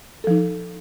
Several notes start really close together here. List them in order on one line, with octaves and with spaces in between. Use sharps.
A4 F3 D#4